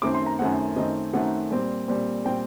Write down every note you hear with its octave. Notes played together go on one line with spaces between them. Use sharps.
F#2 D#3 A3 C4 D6
C6
A#5
F#2 D#3 A3 C4 F#5
F#2 D#3 A3 C4 D#5
F#2 D#3 A3 C4 F#5
A#2 G3 C4
A#2 G3 C4
A#2 G3 C4 G5